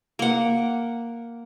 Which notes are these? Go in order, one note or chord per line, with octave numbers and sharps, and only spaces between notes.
A#3 F#5